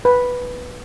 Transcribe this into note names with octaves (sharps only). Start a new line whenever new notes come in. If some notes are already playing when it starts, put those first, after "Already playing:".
B4